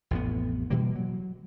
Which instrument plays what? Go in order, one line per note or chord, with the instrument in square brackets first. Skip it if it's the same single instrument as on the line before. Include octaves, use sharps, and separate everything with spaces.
[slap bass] A1 F2 A2 B3
B2 E3 G3 A#3
F#3